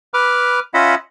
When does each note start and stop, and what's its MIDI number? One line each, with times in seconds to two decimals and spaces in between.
0.14 0.60 71
0.14 0.60 83
0.14 0.60 86
0.14 0.60 89
0.74 0.95 61
0.74 0.95 65
0.74 0.95 75
0.74 0.95 76
0.74 0.95 78
0.74 0.95 83